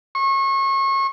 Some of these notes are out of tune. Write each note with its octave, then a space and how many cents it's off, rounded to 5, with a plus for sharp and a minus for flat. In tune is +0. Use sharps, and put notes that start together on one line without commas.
C#6 -35